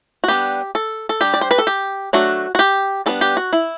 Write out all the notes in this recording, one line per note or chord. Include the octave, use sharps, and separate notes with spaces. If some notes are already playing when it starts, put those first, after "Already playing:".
F#4
G3 B3 D4 G4
A4
A4
G3 D4 G4
D5
C5
B4
A4
G4
F#3 A3 D4 F#4
F#4
G4
G3 B3 D4 A4
G4
F#4
E4